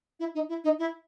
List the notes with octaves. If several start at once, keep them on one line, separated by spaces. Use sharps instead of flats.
E4
D#4
E4
D#4
E4